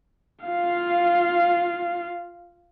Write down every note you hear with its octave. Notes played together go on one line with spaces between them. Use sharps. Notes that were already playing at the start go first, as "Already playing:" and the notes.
F4 F5